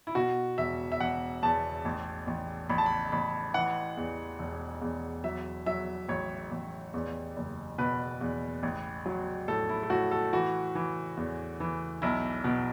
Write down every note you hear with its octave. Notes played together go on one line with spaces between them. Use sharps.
E4
B2 F#4
E1 E5
E5
E1 F#5
E2 A5
A1
A1
A1 B5
A5
B5
A1 B5
E3 F#5
E2
E1
E2
F#3 E5
F#3 E5
A1 C#5
A1
E2
F#1
B2 B4
E2
A1
F#3
A2 A4
E4
A4
A2 F#4
A4
E3 F#4
E3
E2
E3
B1 E4
B2